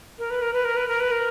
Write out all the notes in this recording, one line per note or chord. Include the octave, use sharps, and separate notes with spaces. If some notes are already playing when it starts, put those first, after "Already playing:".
A#4
B4
A#4
B4
A#4
B4
A#4
B4
A#4